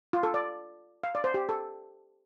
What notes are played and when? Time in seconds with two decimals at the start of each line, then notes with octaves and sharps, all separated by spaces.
0.13 F4
0.23 A4
0.34 D5
1.04 F5
1.15 D5
1.24 C5
1.34 G4
1.49 A4